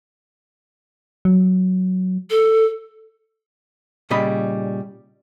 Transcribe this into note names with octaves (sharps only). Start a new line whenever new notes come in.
F#3
A4
A#2 C#3 G3 D#5 B5